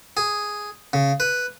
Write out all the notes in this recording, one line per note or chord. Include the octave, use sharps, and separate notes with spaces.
G#4
C#3
B4